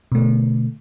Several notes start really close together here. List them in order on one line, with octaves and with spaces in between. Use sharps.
B2 A3 D3